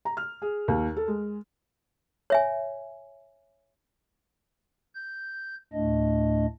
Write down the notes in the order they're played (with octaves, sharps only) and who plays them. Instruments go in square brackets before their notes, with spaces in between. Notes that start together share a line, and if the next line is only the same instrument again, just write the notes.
[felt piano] A#5
F6
G#4
D#2
A4
G#3
[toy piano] C#5 E5 G#5
[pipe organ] G6
D2 A2 A3 D4 D#5